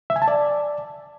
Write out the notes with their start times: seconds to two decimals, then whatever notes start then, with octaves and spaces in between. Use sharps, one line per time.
0.10 E5
0.16 G#5
0.22 A5
0.28 D5